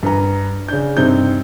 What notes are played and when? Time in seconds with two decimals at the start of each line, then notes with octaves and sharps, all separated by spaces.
0.03 G2 B4 A#5
0.68 C#3 D4 G6
0.97 G2 C3 C4 D#4 G6